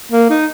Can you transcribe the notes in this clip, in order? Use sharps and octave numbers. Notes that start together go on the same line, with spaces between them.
A#3
D#4